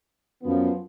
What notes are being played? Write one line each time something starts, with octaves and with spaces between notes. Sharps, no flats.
F#2 F3 B3